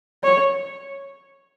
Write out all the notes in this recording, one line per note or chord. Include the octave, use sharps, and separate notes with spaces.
C#5